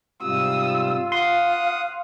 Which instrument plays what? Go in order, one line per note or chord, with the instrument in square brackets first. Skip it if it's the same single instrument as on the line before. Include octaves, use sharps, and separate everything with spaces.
[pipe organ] G#2 C3 G3 [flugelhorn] F4 [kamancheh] D#6 E6
[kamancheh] F5 [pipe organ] F#5 D#6 [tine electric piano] C6